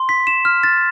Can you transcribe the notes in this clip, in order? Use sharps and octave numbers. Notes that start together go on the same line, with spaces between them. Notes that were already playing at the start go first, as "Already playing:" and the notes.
Already playing: C6
B6
E7
F6
A6